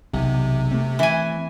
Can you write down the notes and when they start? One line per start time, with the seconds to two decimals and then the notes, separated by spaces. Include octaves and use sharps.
0.13 B1 E2 C3
0.71 A3 C4
0.99 E3 G#5